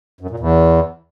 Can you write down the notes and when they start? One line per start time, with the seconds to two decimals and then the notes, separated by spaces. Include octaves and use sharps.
0.21 F#2
0.30 A#2
0.40 E2